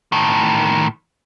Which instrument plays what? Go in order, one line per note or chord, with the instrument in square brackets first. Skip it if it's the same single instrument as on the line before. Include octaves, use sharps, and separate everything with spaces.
[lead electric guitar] A2 D#3